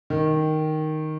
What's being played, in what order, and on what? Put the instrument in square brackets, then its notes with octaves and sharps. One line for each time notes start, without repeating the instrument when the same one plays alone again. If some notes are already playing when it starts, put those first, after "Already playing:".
[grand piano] D#3